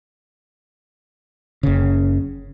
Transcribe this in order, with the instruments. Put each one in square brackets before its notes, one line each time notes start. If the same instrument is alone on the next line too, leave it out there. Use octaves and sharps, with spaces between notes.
[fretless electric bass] F#1 C#3